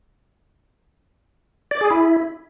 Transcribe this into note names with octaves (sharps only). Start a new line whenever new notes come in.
D5
G#4
E4